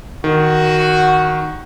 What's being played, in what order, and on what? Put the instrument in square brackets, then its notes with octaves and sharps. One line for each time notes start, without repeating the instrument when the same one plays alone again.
[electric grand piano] D#3 [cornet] F#4